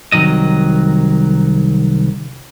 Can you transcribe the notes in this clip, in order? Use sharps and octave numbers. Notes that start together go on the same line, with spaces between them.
C2 D#3 F#3 D#5